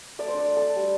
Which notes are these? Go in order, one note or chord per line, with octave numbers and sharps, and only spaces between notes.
A3 D5
C5
D4 D5
A3
A4
D4
G3